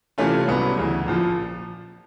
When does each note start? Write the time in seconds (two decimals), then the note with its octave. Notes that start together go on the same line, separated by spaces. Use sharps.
0.18 C3 E3 A3 C#4 F4
0.48 C2 A#2 F#3 B3
0.77 D2 C#3 E3
1.06 A#1 A#2 F3